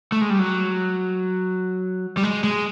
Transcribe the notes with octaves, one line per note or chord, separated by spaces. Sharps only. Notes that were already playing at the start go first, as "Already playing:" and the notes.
A3
G#3
G3
F#3
G3
G#3
G#3